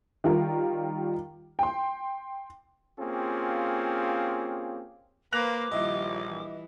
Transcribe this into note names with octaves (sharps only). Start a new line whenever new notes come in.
D#3 G3 F4 A#4
G5 C6
A#3 C4 C#4 F4 G4 G#4
A#3 B4 C5 D6 F#6 A#6 F7
A#1 D#3 G3 E4 F4 D#5
E3